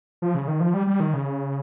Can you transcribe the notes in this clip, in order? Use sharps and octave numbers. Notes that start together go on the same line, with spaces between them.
F3
C#3
D#3
F3
G3
G3
D#3
C#3